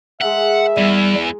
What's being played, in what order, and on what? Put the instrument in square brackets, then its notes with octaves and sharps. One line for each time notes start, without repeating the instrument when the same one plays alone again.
[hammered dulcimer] G#3 G#4 A#4 [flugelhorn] E5 [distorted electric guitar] F#5
[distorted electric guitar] E2 E3 [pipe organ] G3